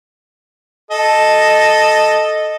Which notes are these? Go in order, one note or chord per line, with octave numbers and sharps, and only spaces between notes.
A4 D#5